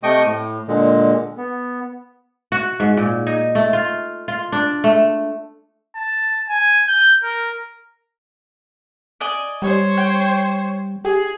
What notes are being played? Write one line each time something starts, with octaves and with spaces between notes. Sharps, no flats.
C3 A3 D#5 G5 C#6 D#6
A2
A#2 D3 G#3
B3
F#4
G#2
A#2
D#4
A3
F4
F4
D4
A3
A5
G#5
G6
A#4
D5 D#5 G#5
G3 C5 C#5
G5
G4 G#4